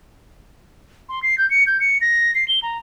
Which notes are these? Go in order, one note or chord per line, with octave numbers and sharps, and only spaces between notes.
C6
C7
G6
C#7
G6
C#7
A#6
C7
G7
A#5